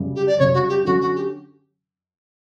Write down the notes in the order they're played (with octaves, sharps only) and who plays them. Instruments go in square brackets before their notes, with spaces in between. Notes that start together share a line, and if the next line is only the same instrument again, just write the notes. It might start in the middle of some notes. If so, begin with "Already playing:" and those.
Already playing: [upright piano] F#2 C#3 G3
[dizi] G4
D5
[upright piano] F#2 C#3 G3 [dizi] C#5
[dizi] F#4
G4
[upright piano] D3 F#3 C#4 [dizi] F#4
[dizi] F#4
G4